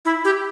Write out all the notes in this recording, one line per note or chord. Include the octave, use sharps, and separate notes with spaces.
E4
G4